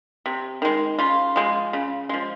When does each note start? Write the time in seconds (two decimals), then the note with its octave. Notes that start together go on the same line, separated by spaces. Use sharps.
0.26 C3
0.62 D#3 G#3
0.99 C#3 F4
1.36 F3 G#3
1.73 C#3
2.09 F3 G#3